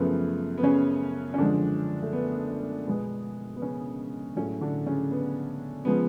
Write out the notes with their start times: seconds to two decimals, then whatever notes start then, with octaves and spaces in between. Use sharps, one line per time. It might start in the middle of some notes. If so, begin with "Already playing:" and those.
Already playing: F#2 C#3 F3 A3 B3
0.58 B3
0.63 C#3 C#4
1.34 C#4
1.38 F#2 D3 F3 G#3 D4
2.02 A3
2.13 B3
2.87 B2 G#3 B3
3.56 B3
3.62 C#3 C#4
4.36 A2 C#3 F#3 A3 C#4
4.61 D3 D4
4.86 C#3 C#4
5.11 B3
5.85 C#3 F3 G#3 B3